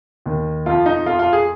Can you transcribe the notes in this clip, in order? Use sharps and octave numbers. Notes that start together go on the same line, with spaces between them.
D#2 D#3
F2 F3 F4
D#4
F2 F3 F4
F4
G#4